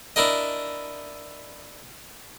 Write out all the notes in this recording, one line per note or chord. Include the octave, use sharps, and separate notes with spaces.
D4 E4 A#4 D#5